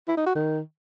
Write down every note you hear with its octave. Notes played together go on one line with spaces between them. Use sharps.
E4
D#4
F#4
D#3